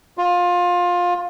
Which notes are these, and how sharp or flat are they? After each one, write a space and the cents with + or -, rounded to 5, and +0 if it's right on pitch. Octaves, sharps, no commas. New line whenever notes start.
F4 +20